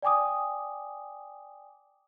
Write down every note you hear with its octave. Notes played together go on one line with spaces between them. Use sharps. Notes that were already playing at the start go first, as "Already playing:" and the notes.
D5 G5 G#5 D6 D#6